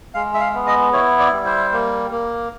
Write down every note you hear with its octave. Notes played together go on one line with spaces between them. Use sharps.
G#3 F5
E5
F5
B3
D#5
E4 C#5
D5
G3
C5
A#3
A#3